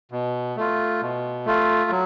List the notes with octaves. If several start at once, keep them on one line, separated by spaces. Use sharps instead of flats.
B2
A3 F4
B2
A3 F4
F#3